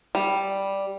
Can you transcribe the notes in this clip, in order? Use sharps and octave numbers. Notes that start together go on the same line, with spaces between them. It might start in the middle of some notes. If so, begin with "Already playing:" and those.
G3